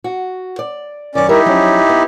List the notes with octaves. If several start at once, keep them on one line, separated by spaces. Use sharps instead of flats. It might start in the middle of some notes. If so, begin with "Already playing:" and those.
F#4
D5
F#2 D#3 C#4 D5
G3 D#4 E4 G4 A#4 E5
F3 F#3 C#4
B3